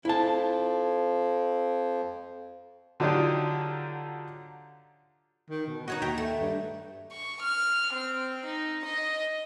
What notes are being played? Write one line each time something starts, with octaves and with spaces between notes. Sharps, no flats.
F2 F3 E4 A5
D3 F#3 D4 D#4 F4 G4
D#3
B2
D#4 F#4 C#5 D#5
D#2 E5 G5 A#5
A3
G2
C#6
F6
C4
D#4
D#5